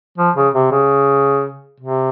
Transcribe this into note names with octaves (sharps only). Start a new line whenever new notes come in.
F3
C#3
C3
C#3
C3